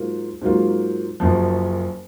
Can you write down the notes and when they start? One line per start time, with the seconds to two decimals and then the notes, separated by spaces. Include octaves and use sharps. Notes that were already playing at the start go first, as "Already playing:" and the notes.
Already playing: G#2 F#3 A#3 F4
0.42 G#2 F#3 A#3 F4
1.20 F#1 F#2 F3